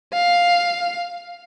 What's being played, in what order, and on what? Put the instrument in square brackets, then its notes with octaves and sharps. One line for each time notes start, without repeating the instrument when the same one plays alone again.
[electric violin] F5